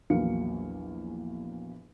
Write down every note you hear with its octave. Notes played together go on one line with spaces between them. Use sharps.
A#1 E2 F#3 A#3 F5 C#7